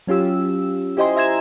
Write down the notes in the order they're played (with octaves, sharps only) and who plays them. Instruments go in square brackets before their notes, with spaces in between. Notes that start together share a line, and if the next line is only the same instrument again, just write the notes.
[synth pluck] F#3 C#4 F4 G4 E6
E4 G4 C5 D#5 G#5 C6
E5 A#5 G#6 E7